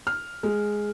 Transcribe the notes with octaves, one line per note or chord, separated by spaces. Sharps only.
F6
G#3